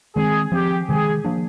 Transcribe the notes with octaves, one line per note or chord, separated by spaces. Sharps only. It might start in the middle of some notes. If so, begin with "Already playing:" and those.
D#3 G#3 C4 G#4
F3 C4 G4
C3 D#3 G#3 G#4
F3 A#3 D4